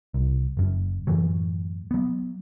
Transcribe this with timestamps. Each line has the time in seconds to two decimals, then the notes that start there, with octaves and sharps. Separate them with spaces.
0.14 C2
0.57 F#1 F#2
1.07 F#2 A2 E3 F#3
1.91 F#3 B3